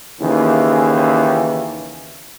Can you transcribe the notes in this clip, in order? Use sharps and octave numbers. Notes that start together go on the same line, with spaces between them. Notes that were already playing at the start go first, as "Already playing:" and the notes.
D#2 C#3 E3